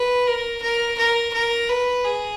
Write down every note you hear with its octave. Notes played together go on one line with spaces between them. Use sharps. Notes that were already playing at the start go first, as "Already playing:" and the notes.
Already playing: B4
A#4
A#4
A#4
A#4
B4
G#4